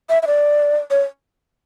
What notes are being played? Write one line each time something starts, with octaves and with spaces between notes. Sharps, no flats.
E5
E5
D5
C#5